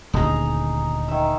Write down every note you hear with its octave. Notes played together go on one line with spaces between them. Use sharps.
D#1 D2 D#4 G#4 A#5
D#3 E5